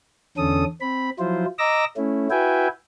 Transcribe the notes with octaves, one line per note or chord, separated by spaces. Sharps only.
E2 D3 C#4 A4 D#6
C4 B5
F3 F#3 E4 F4 C5
D#5 A#5 D6 E6 A#6
A3 C#4 E4
E4 F#4 B4 E5 G5 G#5